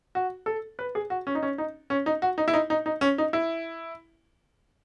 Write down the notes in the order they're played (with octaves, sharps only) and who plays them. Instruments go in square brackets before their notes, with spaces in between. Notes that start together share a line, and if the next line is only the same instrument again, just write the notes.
[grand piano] F#4
A4
B4
G#4
F#4
C#4
D#4
C#4
D#4
C#4
D#4
F#4
D#4
E4
D#4
D#4
D#4
C#4
D#4
E4